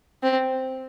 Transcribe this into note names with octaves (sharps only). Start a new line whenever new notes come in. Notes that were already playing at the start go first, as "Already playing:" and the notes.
C4